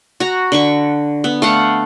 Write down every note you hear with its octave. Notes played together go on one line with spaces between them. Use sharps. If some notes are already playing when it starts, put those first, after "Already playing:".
F#4 A#5
D3 B5 C#6
B3
A3 F5 F#5